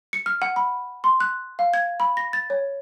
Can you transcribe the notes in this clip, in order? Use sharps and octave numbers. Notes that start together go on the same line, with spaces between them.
C#7
F6
F#5
B5
C6
F#6
F5
G#6
B5
A#6
A6
C#5